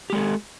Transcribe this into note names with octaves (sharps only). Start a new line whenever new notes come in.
G#3 G4 A4